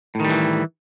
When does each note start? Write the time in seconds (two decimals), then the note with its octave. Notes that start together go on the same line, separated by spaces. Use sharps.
0.15 A2
0.20 D#3
0.25 G3
0.29 E3